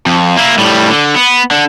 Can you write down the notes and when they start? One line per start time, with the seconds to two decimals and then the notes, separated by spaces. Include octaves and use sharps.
0.06 F2
0.37 A#3 E4
0.59 A2 G3
0.89 D3
1.15 B3
1.51 D3